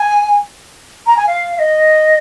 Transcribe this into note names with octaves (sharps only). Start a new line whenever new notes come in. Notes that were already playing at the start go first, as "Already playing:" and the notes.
Already playing: G#5
A#5
G#5
F5
F5
D#5